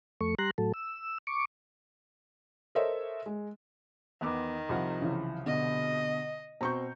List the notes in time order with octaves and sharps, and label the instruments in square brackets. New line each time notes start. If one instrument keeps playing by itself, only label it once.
[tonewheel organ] F2 A3 C#6
G3 A#5 C6 F#6
A2 F#3 A4
E6
C#6 D6
[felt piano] A4 A#4 C5 C#5 D#5 E5
G#3
[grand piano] E2 B3 D6 [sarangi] D#3
[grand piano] C2 F3 F#5
[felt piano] C#3 E3
[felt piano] B2 D3 [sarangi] D#5
[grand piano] B2 C4 [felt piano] A#5 C#6 G6